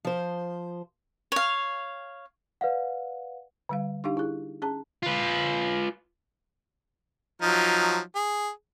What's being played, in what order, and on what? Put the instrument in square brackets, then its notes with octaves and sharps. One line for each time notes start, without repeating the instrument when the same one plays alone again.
[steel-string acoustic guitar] F3 C5
[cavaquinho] C#5 F5
[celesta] B4 D5 F5 F#5
[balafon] D3 G3 F5
D4 D#4 G4 F5
E4 G#4
C#4 G#4 A5
[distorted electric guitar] F4 B4
[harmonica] F3 F#3 D#4
G#4